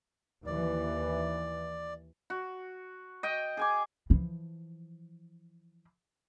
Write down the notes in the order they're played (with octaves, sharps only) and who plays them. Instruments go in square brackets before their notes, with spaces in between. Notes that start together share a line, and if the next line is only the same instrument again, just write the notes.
[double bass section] D#2 E3 [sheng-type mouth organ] D5
[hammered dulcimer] F#4
D#5 G5
G#4 G#5 D6
[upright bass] E3 F3